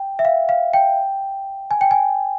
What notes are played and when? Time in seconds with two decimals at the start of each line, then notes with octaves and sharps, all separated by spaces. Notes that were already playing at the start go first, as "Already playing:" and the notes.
Already playing: G5
0.19 E5
0.25 F5
0.49 F5
0.74 G5
1.71 G#5
1.81 G5
1.91 G#5